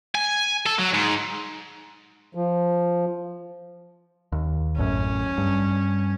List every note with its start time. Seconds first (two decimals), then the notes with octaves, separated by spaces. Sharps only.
0.15 G#5
0.66 A4
0.79 F#3
0.94 G#2
2.35 F3
4.32 D#2
4.78 A1 F#2 C#4
5.38 G2